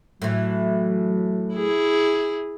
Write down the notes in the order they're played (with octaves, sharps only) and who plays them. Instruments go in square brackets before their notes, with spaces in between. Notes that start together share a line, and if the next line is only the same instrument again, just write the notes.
[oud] A2 E3 [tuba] F#3
[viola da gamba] E4 G#4